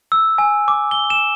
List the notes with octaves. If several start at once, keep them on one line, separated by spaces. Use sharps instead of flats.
E6
G#5
D6
G7
E7